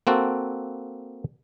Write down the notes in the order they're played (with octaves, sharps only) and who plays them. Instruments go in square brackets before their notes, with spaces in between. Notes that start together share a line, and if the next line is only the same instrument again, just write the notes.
[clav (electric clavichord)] A#3 C4 F#4 A4